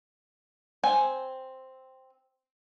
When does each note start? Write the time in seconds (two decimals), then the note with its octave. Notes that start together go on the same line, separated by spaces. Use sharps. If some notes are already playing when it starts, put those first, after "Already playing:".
0.83 C4 G#5